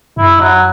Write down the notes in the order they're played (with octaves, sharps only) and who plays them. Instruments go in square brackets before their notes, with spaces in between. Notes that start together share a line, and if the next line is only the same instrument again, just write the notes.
[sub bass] F#2 [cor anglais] E4
[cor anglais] F#3